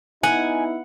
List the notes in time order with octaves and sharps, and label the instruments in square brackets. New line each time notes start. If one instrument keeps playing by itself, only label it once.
[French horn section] B3 D#4 E4 [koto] F#5 [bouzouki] G#5